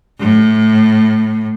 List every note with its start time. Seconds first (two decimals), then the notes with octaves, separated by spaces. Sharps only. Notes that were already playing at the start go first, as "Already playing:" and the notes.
0.19 A2